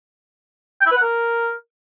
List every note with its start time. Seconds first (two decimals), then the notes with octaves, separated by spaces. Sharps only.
0.81 G5
0.86 E4
0.91 B4
0.96 F#5
1.01 A#4